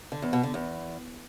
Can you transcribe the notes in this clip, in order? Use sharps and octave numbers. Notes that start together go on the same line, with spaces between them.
D3
E2
B2
D3
E2